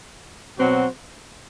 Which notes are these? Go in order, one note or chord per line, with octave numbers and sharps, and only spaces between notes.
B2 F#3 C4 F#4